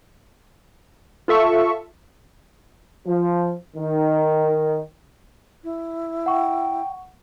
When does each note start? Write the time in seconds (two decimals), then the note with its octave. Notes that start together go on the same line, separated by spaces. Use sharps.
1.28 F4 A4 E5 C#6
3.06 F3
3.76 D#3
5.64 E4
6.26 F#5 G5 C#6